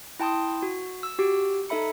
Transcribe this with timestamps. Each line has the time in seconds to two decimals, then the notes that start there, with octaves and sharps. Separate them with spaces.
0.20 E4 G5 A5 C6 D#6
0.62 F#4
1.03 E6
1.18 F#4 G4 E6 D7
1.69 D#4 A4 E5 B5 C#7